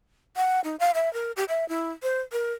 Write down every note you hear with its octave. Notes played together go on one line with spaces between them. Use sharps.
F#5
D#4
F5
E5
A#4
G4
E5
E4
C5
A#4